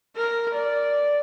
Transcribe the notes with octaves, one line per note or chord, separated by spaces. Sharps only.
A#4
D5